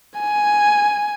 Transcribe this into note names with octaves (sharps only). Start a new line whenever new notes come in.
G#5